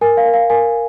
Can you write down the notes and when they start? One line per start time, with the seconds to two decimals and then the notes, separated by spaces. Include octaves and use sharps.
0.01 A#4 G#5
0.17 F5
0.26 A#4
0.34 F5
0.50 A#4 G#5